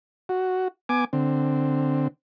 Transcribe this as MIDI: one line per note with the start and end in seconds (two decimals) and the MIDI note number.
0.29 0.68 66
0.89 1.05 59
0.89 1.05 80
0.89 1.05 86
1.13 2.08 50
1.13 2.08 60